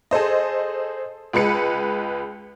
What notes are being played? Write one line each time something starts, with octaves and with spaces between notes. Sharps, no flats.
G#4 A4 C5 D#5
C#2 G#3 B4 C#7